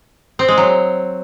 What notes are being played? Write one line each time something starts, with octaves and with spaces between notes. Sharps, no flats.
C4
G#3
F#3